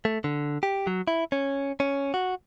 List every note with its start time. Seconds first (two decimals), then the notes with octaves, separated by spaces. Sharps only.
0.05 A3
0.24 D3
0.63 G4
0.87 F#3
1.08 E4
1.32 C#4
1.80 C#4
2.14 F#4